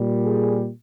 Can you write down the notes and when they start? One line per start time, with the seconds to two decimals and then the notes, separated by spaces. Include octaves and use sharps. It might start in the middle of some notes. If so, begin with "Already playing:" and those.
Already playing: A#2 G3
0.25 G#4